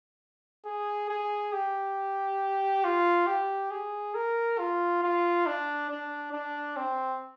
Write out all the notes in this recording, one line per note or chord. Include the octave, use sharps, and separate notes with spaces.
G#4
G#4
G4
F4
G4
G#4
A#4
F4
F4
D4
D4
D4
C4